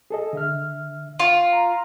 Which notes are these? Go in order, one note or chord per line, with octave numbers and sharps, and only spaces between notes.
G#4 A4 D#5
D3 E5 F6
F4
A#5